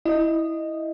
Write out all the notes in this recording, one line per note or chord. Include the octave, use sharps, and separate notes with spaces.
E4 D#5